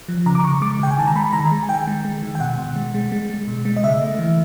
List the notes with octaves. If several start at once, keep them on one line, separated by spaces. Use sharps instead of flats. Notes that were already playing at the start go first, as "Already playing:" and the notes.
F3
C#3 A#5
D6
C#3 C#6
G#3 D6
C#3 G5
G#5
D#3 A5
A#5
G#3 B5
D#3 A#5
G#3
G#5
D#3 G5
G#3
G#3
D#3
G5
B2 F#5
B2
G#3
G#3
G#3
G#3
B2
G#3
D#5
C#3 E5
A3
E3